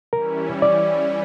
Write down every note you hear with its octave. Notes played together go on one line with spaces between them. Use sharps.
E3 G3 C#4 E4 A#4
D5